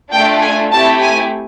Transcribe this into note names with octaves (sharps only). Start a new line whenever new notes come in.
A3 D4 F4 A4 G5
G#5
A3 C4 E4 G4 A5
G#5